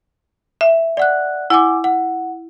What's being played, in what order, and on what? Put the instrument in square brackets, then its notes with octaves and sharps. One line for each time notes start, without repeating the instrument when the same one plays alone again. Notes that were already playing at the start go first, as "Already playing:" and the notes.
[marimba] E5
[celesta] D5 F#5 F#6
[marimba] E4 [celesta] F#5 G#5 D6
[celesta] F#5